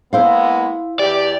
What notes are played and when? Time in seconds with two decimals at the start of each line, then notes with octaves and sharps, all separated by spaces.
0.13 G#3 A#3 B3 E4 C5 F5
0.99 E2 E4 G4 D5